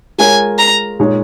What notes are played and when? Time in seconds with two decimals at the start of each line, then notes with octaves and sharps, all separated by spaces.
0.18 G#3 F4 A#4 C#5 G#5
0.59 A#5
0.99 A#2 G#3 D#4 G#4 C#5